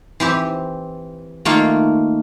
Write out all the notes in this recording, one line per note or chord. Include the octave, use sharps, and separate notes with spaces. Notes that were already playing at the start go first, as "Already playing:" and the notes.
E3 C4 G4
D#3 A3 A#3 F4